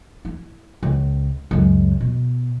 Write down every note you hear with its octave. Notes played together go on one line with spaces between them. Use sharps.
E4
C#2
C#2 F#2
B2